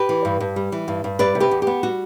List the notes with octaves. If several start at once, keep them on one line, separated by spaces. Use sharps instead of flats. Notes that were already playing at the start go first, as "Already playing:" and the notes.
Already playing: G4 B4
E3
G2
G2
G3
E3
G2
G2
G3 B4 D5
C3
G4 B4
E2
B3 G4
G3 F#4